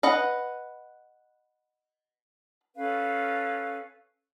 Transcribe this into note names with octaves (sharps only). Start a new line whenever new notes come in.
B4 D#5 F#5
C#4 A4 B4 F5